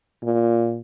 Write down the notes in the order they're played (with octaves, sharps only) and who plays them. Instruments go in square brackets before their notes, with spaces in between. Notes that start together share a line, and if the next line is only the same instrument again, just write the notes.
[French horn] A#2